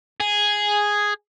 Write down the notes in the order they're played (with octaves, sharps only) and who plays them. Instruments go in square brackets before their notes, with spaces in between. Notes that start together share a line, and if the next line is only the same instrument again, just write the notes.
[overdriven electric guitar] G#4